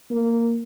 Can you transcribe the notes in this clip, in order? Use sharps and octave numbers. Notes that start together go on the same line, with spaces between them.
A#3